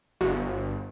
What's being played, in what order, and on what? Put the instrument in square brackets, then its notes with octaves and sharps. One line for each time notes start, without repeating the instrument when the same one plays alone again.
[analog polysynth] G1 [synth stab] F#4